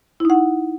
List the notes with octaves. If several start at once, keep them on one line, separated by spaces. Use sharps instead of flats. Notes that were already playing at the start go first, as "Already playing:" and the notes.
D#4 E4 F#5